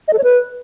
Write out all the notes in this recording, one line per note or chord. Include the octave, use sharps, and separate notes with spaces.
D#5
A4
C#5
B4